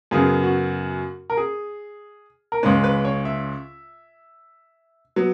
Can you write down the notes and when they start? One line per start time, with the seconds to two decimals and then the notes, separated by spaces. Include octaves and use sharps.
0.11 F#2 C#3 F#3 B3 G#4
0.43 F#4
1.30 A#4
1.37 G#4
2.52 A#4
2.63 C#2 C#3 G#3 C#4 B4
2.84 B4
3.05 C#5
3.25 E5
5.16 F#3 B3